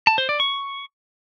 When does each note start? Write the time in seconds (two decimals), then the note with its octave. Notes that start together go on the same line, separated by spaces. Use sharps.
0.07 A5
0.18 C5
0.29 D5
0.40 C#6